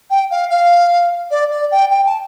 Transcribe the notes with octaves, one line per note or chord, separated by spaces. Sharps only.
G5
F5
F5
D5
D5
G5
G5
A5